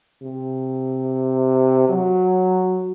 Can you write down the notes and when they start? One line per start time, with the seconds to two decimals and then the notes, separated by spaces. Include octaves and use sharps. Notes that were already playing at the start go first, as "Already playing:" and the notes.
0.22 C3
1.89 F#3